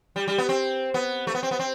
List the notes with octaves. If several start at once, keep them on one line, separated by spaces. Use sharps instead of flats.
G3
G3
B3
C4
B3
A3
B3
C4
B3
C4